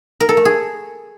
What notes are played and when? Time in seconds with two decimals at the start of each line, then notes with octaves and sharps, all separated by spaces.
0.20 A#4
0.29 A4
0.37 A3
0.45 G#4